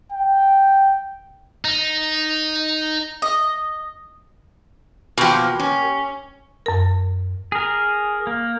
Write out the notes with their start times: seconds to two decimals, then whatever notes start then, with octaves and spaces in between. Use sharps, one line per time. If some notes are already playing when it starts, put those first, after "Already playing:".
0.12 G5
1.65 D#4
3.22 D#5
5.18 B2 F3 A#3 G4
5.59 C#4
6.66 F#2 A#4
7.52 G#4 A#4
8.27 A#3